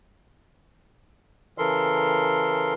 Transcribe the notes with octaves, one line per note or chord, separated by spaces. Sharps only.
C#3 E3 A4 A#4 C6